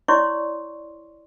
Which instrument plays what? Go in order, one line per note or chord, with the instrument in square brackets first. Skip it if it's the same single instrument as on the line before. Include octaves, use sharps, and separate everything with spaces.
[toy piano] E4 C#5 D5 C6 C#6